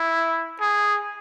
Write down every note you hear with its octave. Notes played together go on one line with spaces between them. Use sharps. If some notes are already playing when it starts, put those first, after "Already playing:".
Already playing: E4
G#4